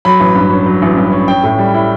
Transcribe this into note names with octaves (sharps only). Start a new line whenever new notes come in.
F#3 B5
A1
G2
C#4
F#3
A1
G2
C#4
C#4 G5
A2
G3
E4